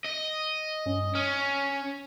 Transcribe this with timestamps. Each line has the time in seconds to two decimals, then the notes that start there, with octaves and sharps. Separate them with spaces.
0.04 D#5
0.86 G2 C#4
1.15 C#4 F6